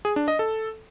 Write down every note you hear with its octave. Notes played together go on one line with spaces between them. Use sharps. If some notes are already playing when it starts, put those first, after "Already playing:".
G#4
D4
D#5
A4